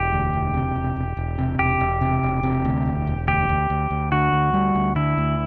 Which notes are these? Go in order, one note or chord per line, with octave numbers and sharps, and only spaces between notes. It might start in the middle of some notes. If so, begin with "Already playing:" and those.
Already playing: E1 G4
D2
E1
C3
E1
E1
E1
C3
E1 G4
E1
C3
E1
C3
D2
E1
E1
D2 G4
D2
D2
D2
D3 F#4
D2
G3
D2
D3 E4
D2